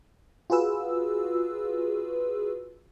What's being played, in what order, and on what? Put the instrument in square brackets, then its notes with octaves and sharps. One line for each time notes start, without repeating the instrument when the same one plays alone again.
[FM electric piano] F4 F#4 G#4 B4 E6